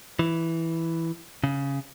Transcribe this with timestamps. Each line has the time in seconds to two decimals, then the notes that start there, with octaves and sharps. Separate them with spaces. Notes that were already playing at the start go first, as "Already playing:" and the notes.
0.19 E3
1.44 C#3